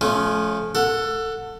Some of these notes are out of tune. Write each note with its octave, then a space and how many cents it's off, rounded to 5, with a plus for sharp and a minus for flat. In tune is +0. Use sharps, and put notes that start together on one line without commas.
F3 +0 A3 -30 C#4 +0
A4 +20 F#5 -15